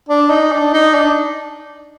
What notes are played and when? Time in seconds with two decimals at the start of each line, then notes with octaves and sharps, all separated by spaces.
0.09 D4
0.30 D#4
0.52 D4
0.74 D#4
0.95 D4